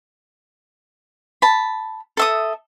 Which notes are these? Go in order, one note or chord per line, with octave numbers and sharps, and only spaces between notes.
A5 B5
A4 E5 D#6